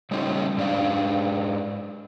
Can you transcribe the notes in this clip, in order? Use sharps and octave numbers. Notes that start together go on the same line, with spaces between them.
C#3 G3 A3 C#4 D#4 F4
G#2 D4 F5